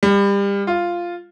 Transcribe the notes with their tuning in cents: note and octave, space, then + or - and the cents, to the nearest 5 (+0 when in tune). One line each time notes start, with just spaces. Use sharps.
G3 +30
F4 -5